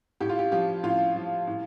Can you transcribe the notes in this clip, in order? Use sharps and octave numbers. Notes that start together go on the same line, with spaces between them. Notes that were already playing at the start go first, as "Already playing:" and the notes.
A2 G4
F4
G4
F3 G4
A2 F4
F3
A2